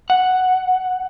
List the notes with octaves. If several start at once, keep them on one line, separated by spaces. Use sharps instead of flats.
F#5